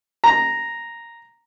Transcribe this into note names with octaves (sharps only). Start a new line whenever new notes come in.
A#5